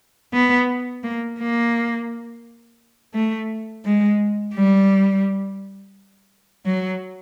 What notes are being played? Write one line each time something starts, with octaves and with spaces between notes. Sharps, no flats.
B3
A#3
A#3
A3
G#3
G3
F#3